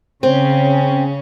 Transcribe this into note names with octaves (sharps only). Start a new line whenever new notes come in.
C#3 C4 C#4